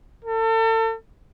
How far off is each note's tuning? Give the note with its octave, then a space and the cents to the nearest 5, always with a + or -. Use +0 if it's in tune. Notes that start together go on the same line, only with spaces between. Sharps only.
A4 +35